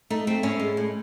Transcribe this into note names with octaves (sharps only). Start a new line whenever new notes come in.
A3 D#4
A3 C4
A2 C#4
G#3
A2